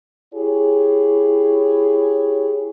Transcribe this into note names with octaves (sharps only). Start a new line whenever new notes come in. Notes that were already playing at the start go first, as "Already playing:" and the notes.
E4 G4 G#4 C#5